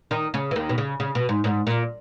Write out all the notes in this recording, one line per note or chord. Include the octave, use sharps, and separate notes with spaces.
D#3 D#4
C#3 C#4
E3
D#2 D#3
B2
C#3
C#3
B2
G#2
G#2
A#2